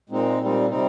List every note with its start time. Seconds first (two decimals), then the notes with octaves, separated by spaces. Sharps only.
0.09 A#2 G#3 C4 D#4
0.39 A#2 G3 C4 D#4
0.70 C3 G3 C4 D#4